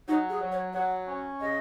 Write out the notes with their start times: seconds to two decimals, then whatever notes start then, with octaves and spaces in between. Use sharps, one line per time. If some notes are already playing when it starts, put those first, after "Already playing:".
0.08 F#3 D#4
0.30 G#4
0.41 F#3
0.52 C#5
0.74 F#3 F#5
1.08 C#4
1.41 C#3 D#5